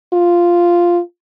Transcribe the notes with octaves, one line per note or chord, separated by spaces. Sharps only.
F4